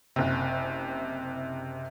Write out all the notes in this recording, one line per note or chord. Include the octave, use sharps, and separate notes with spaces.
F#1 C3